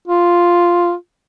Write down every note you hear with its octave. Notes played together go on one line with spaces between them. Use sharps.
F4